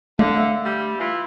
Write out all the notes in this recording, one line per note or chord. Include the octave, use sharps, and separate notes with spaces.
D3 A3 F5
E5
G3
E3 E4 F4